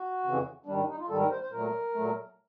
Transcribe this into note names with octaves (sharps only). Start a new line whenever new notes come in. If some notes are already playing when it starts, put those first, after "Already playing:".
Already playing: F#4
F2 C#3 E3
G#2 D#3 G3 D4
D4
D#4
F4
G#2 D#3 G3 A4
A#4
C5
C5
A#2 F#3 A3 A#4
A#2 F#3 A3